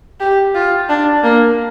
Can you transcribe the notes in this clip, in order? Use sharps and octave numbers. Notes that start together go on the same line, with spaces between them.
G4
F4
D4
A#3